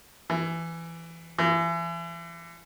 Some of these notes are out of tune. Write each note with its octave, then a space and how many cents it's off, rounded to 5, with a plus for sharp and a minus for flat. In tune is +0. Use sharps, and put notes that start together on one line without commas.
E3 +15
E3 +35